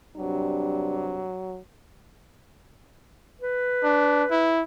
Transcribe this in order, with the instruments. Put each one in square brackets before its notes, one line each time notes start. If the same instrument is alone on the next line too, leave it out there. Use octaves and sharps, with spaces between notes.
[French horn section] G2 C3 D4 [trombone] F#3
[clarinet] B4
[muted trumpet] D4
E4